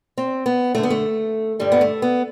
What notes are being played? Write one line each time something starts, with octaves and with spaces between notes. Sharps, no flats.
C4
B3
F#2 D3 A3
B3
A3
G2 D3 G3
B3
A3
B3